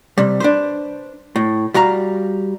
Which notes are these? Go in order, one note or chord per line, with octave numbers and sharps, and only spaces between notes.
C3 G3
D4 B4 C5
A2
G3 F#4 F5 A#5